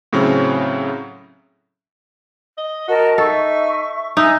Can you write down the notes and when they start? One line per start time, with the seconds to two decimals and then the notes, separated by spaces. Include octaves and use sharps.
0.13 A2 C#3 F#3 C4 C#4
2.58 D#5
2.88 F#4 A#4 D#5 A5
3.18 D#4 A4 E5 C#6
4.17 D#4 D#5 E5 G#5